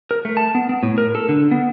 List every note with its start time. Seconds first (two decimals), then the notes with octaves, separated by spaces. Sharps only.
0.11 A#4
0.25 A3
0.37 A5
0.55 B3
0.69 B3
0.83 A2
0.98 A#4
1.15 A4
1.29 D3
1.51 B3